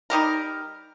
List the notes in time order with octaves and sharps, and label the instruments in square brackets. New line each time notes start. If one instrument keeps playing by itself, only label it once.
[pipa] G3 D#4 G4 A#4